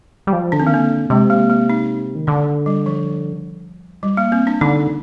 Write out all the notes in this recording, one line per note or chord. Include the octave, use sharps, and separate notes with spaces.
G3
F3
D3 D4
C4
D#3 A#3
D3 C4
C3 G#3
A#3
A#3
D#4
D#3
D3 D4
G3
F3
G3
A#3
C4
D4
D3 D#4